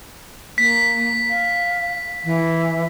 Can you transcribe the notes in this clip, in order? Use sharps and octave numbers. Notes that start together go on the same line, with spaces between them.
A#3 B6
F5
E3